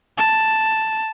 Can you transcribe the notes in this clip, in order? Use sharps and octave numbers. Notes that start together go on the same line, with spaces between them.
A5